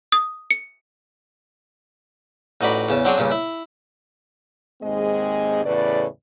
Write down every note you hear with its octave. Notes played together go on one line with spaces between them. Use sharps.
D#6
C#7
A1 D#4 F#4 D5 B5
E2 C#3 A5
F#3 C4 D4 F#4 G#4 C#5
G2 A#2 C#3
E4
D#2 G#2 G#3 C4 G#4 D#5
E2 A2 C#3 B4 D5